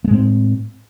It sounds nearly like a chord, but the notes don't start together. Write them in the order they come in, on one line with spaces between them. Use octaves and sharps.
A#3 G#3 A2 C4